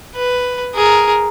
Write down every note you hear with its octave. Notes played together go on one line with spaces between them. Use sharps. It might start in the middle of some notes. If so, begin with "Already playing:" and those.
B4
G#4 A#4